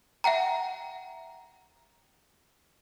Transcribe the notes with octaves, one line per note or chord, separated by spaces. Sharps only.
E5 F#5 G5 A#5